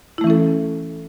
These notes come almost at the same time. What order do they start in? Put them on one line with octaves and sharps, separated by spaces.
E4 A3 E3 C#4 A4